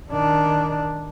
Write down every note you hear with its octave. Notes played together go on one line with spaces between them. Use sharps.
D#3 D4